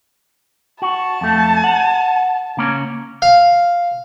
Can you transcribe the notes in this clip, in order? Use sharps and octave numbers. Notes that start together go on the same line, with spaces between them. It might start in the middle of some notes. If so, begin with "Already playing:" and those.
F#4 A5
F2 A3
F#5
C#3 A#3 C#4
F5